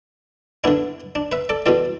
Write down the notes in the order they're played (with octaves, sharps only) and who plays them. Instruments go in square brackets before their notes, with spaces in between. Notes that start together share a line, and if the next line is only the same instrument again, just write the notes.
[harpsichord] D3 B3 D4 E4
D4
B4 E5
A4 D5
E2 B2 B3 A4 D5